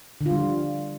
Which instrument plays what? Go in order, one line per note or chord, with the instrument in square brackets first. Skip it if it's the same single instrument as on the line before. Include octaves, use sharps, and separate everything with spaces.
[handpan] D3
F4
G3
F3